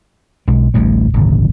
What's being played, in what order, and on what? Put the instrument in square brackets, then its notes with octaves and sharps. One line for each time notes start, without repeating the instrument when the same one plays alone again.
[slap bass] B1 G#3
A1 D2 A2 G3
D1 G#1 A#2 C#3